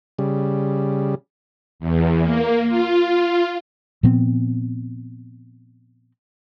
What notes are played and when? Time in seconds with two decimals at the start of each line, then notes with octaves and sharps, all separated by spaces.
0.19 C#3 G3
1.80 E2
2.22 A#3
2.68 F4
4.03 A#2 F3 B3 C4